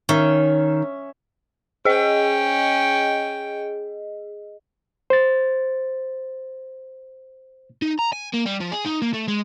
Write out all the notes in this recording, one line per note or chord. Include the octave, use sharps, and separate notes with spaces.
D#3 C#4 E5
C#4 G#4 D#5 G5
C5 A6
D#4
A#5
G#5
A#3
G3
F3
G#4
D#4
A#3
A3
G#3